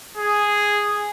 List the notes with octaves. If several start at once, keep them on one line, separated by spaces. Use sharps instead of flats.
G#4